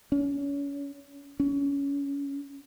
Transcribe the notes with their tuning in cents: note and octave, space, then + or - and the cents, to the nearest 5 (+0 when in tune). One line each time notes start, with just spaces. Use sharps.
C#4 +30
C#4 +20